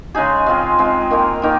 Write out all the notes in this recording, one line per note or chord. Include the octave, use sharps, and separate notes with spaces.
C#3 G#3 D#4 G#4
G#3 C4 F4
G#3 C4 F4
D#3 A#3 D#4 A#4
D#3 A#3 D#4 A#4